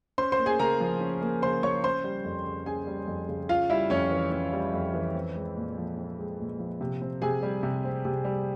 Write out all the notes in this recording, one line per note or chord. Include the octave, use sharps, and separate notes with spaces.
C#4 C5 C6
C5 C6
A#3
G#4 G#5
C#3 A#4 A#5
F3
C#4
A#3
C#3 C5 C6
F3 C#5 C#6
C#4 C5 C6
G3
F2
C#3
C#4 G#4 G#5
G3
F2
C#3
C#4 F4 F5
G3 E4 E5
F2 C#4 C#5
E3
C#4
G3
F2
E3
C4
G#3
A#2
F3
C4
G#3
A#2
F3
C3
C4
C3 G#4 G#5
G3
C3
C4
C3
G3